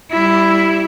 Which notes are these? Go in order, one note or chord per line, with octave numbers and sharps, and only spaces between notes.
G3 E4